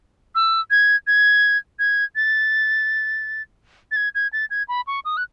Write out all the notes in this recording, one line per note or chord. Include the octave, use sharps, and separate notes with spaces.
E6
G#6
G#6
G#6
A6
A6
G#6
G#6
A6
G#6
B5
C#6
D#6
F#6